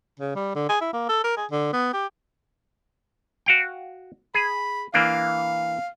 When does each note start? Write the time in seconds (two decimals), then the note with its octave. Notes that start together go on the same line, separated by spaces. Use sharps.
0.20 C#3
0.35 G3
0.55 D3
0.69 G#4
0.81 E4
0.93 A#3
1.09 A4
1.24 A#4
1.37 G#4
1.51 D3
1.73 B3
1.93 G4
3.46 F#4 F5 G5
4.35 G#4 B5
4.94 E3 A#3 D4 F5